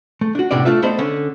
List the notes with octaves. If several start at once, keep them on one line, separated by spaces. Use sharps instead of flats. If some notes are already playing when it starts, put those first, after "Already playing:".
A3
D4 F#4
A2 C3 B3 C#4 D4 D5
A3 D4 F4 E5
A3 B3 C5 D5 D#5
D3 C#4